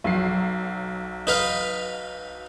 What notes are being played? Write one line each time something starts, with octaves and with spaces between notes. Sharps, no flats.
B1 F#3 C7
D#4 B4 F5